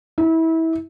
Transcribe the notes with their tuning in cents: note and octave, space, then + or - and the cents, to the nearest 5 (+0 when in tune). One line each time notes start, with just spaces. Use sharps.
E4 -25